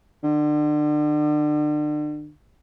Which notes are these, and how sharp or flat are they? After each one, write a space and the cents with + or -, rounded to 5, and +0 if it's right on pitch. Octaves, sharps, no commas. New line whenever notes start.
D3 +35